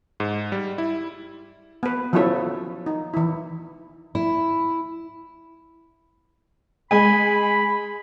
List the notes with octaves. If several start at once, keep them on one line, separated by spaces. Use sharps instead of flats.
G#2
G3
E4
B3 B4
F3 F#3 B3 C#4 E4 A4
D#4
E3 E4
E4
G#3 G#5 B5